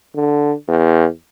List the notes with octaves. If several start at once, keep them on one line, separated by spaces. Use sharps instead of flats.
D3
E2